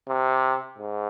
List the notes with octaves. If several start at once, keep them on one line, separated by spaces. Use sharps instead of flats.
C3
G#2